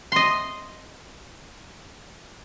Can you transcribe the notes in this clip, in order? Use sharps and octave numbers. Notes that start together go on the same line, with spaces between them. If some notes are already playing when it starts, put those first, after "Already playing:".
D#5 C6